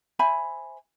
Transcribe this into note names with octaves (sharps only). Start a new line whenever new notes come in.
C5 E5 G#5 B5